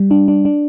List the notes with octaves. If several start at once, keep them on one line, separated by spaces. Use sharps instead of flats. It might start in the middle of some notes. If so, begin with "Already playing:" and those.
Already playing: G3
D4
D4
D4